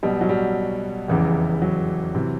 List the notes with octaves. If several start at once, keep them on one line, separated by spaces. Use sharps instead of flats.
B1 B2 G3
F#3
G3
F1 E2 C#3 E3
F#3
C3 E3